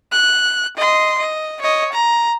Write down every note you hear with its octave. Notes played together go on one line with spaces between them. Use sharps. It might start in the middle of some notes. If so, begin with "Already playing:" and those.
F#6
D#5 C6
D#5
C#5 D#5
A#5